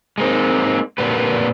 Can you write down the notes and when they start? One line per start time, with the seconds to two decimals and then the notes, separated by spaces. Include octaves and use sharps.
0.18 G#3 A#3 C4 D#4
0.98 A#2 D3 A#3 G4 B4